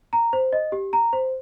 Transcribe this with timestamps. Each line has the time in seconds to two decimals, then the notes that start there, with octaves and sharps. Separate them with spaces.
0.13 A#5
0.33 C5
0.53 D#5
0.72 G4
0.93 A#5
1.13 C5